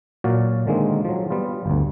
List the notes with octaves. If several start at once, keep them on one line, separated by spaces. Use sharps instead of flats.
A#2 F#3 F#4 D5 F5
D3 D#3 G#3 A#3 C4
F3 F#3
G3 B3 F4
G1 D2